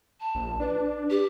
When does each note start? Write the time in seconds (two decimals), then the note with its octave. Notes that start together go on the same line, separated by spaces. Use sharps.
0.20 A5
0.35 A#1
0.60 D4 B4
1.10 G4